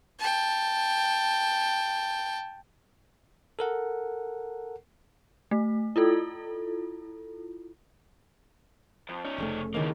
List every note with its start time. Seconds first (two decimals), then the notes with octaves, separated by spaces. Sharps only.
0.19 G5 A5
3.59 A4 A#4 F#5
5.51 A3
5.96 E4 F4 A4
9.09 F2
9.24 C#4 D#4
9.38 F1 C#3 A3
9.74 C#2 D#3 E3 A#3